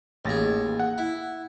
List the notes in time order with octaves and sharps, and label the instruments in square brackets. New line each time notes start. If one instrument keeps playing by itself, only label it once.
[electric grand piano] A1 A6 A#6 [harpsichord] D#2 G#4
[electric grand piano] F#5
[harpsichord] E4